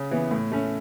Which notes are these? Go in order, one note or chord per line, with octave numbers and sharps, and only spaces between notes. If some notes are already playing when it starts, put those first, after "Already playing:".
Already playing: C#3
E3 B3
A2
A3 C#4